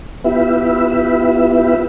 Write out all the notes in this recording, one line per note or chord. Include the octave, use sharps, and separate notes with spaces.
B3 E4 F4 G4 B4 E5